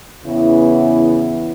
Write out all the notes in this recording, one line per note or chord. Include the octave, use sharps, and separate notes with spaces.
E2 C#3 E3 B3 E4